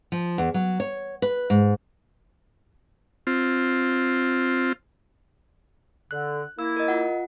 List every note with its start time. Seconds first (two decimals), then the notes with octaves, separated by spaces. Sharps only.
0.12 F3
0.38 E2
0.54 F#3
0.80 C#5
1.22 B4
1.50 G#2
3.27 C4 F4
6.11 D3 F#6
6.59 A#3 E4 E6
6.77 A#4 D#5
6.88 F4 F#5